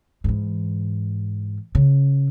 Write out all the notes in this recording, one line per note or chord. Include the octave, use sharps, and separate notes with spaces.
G#2 E3
C#3